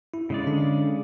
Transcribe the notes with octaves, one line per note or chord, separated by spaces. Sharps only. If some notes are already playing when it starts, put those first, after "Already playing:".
E4
C#3 G#3 D5
D3 D4